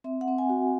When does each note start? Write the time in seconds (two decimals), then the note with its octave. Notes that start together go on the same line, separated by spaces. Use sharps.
0.04 C4 E5
0.21 F#5
0.28 C4
0.38 G#5
0.49 F#4